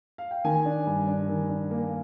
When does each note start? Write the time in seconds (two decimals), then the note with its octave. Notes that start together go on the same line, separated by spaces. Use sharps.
0.18 F5
0.31 G5
0.44 D#3 G#5
0.65 D4
0.87 G2
1.08 D4
1.29 D#3
1.49 D4
1.71 A#3